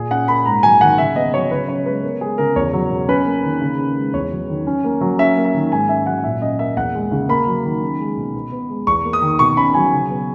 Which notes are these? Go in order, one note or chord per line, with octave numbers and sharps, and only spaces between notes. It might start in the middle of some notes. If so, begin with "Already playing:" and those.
Already playing: A#2 G#4
C#4 F#5
A#3 B5
G#2 A#5
F#3 G#5
D#3 F#5
C#3 E5
B3 D#5
F#3 C#5
C#3 B4
C#4 C#5
G#3 B4
B3 A#4
G#3 G#4
C#3 A#4
E2 C#5
F#3
B2
C#4 B4
A#3
D#3
C#3
C#4
G#3
E2 C#5
F#3
D#3
C#4
A#3
F#3
C#4 E5
A#3
E5
D#3
G#2 G#5
C#4 E5
F#3 F#5
A#2 E5
C#4 D#5
A#3 E5
E2 F#5
G#3
C#3
A#3 B5
F#3
D#3
C#4
G#3
B2
B2
B3
G#3
E2 C#6
A#3
D#6
D#3
B2 C#6
C#4 B5
F#3 G#5
C#3
B3